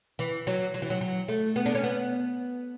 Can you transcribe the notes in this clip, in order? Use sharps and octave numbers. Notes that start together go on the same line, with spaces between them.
E3
F#3
F#3
E3
F#3
F#3
A3
B3
D4
C#4
B3